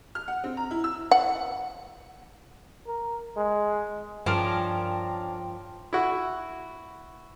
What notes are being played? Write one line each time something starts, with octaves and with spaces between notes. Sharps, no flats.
F6
F#5
C4
A#5
E4
E6
F#5
A#4
G#3
G2 F3 C#4 D4 A#4 G5
E4 F#4